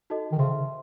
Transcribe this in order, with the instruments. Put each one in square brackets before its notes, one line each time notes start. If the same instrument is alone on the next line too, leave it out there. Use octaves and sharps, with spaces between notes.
[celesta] D#4 F#4 A4 D#5 A5
[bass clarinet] D#3
[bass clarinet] C#3 [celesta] C5 E5 C6